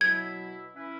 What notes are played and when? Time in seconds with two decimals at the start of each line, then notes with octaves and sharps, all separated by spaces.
0.01 B2 F#3 E4 G#6
0.74 E3 C#4 E4 B4